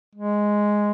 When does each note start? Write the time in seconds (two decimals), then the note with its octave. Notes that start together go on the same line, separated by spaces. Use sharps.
0.16 G#3